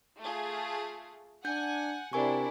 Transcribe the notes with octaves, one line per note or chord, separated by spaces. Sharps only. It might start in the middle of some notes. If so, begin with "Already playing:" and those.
A3 F4 G#4
D4 F#5 G#5 G6
C3 D4 E4 A#4 G#5 C#6